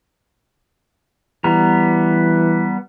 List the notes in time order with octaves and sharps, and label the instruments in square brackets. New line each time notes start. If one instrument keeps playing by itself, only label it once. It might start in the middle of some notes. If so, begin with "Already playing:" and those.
[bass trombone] E3 [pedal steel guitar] G3 B3 A#5